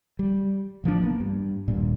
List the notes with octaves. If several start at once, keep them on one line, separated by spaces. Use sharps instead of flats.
G3
A1 F3 G#3 D4
A#3 B3
G2
D#1 G2 A#2